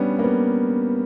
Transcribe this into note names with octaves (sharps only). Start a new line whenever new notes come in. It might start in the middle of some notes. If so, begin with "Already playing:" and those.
Already playing: G3 B3 C#4 D4
A#3
B3